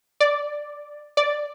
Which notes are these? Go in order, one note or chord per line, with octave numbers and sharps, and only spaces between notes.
D5
D5